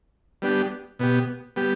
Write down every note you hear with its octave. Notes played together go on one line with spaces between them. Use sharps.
G3 B3 D4 G4
B2 B3 G4
G3 B3 G4